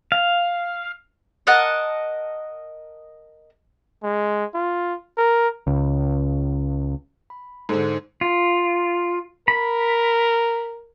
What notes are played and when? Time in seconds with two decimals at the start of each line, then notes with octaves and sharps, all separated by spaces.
0.12 F5
1.47 A#4 D#5 F#5 A5
4.04 G#3
4.55 F4
5.18 A#4
5.67 C#2
7.30 B5
7.69 G#2 D3 D#4 A4 C5
8.21 F4
9.48 A#4 B5